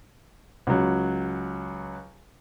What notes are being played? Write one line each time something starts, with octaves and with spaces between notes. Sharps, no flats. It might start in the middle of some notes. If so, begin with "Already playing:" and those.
C#2 F#3